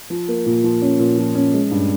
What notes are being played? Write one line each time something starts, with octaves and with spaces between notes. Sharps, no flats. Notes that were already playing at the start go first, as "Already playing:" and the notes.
F3
A#3
A#2
F3
C#4
A#2
F3
C#4
G#3
G2